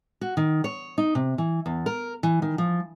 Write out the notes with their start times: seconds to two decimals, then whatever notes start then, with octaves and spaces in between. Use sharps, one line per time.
0.21 F#4
0.37 D#3
0.64 C#5
0.98 D#4
1.15 C3
1.38 E3
1.66 E2
1.86 A#4
2.23 E3
2.42 D#3
2.58 F3